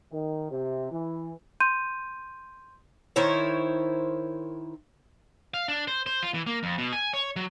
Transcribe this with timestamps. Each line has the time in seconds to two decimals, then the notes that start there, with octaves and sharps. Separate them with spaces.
0.12 D#3
0.51 C3
0.91 E3
1.60 C6 G6 D#7
3.16 D#3 E4 C5 C#5
5.54 F5
5.68 D4
5.87 C5
6.06 C5
6.23 F4
6.34 E3
6.47 A#3
6.63 F2
6.78 B2
6.93 G#5
7.14 C#5
7.36 F#3